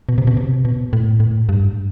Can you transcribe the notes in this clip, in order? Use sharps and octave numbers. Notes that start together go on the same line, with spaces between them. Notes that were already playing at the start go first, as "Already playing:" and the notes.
B2
C3
B2
C3
B2
A2
A2
G2